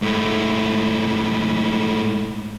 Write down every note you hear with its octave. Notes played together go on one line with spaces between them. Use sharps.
G#2 A3